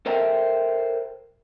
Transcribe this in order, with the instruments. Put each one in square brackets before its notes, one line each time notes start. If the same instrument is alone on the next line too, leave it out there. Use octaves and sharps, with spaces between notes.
[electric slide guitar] A4 A#4 C5 E5 G5